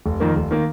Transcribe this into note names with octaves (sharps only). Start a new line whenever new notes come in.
F1
F2 D#3 A#3
F1
D#3 A#3